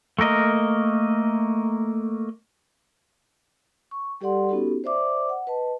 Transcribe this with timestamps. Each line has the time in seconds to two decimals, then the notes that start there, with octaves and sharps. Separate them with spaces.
0.19 A3 A#3 A#4 D#5
3.91 C#6
4.21 G3 G4 A4 D5 F#5 C6
4.49 B3 C#4 D#4 F#4 G4 A4
4.84 C5 D5 E5 D6
5.29 F#5
5.47 B4 D#5 A5